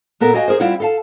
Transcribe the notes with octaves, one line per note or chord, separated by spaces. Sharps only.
A#2 B3 A4 A#4
F#4 G4 D#5 F5 G#5
G#4 A#4 C5
G3 C4 E4 F4 F5 F#5
A4 F5 A5